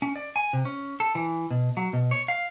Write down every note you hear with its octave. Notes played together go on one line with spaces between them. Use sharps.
C#4
D5
G#5
C3
C#4
A4
E3
B2
F#3
B2
C#5
F5